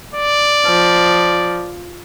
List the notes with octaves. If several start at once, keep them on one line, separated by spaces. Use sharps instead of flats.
D5
F3